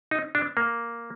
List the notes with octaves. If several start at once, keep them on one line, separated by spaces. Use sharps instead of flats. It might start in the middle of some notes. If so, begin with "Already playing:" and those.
D#4
D4
A#3